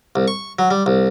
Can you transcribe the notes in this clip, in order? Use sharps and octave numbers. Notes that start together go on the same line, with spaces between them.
C2
C#6
F#3
G3
C2